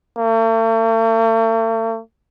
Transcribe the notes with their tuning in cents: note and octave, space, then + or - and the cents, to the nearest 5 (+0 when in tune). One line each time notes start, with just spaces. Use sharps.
A3 +45